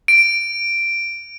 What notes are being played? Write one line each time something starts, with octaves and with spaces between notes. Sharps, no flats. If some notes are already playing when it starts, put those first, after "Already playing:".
D7